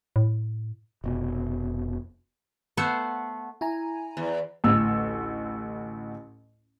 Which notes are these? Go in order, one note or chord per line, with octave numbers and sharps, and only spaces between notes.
A2
F1 B2
A3 B3 C5 F#5
E4 G#5 A#5
E2
A1 D2 E6